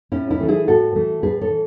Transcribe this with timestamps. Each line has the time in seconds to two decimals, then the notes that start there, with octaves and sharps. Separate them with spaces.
0.12 A2 C#4 E4
0.30 C#4 E4
0.40 E3 A3
0.48 E4 G#4
0.67 A2 F#4 A4
0.95 E3 A3
1.23 A2 G#4 B4
1.41 A4 C#5
1.50 E3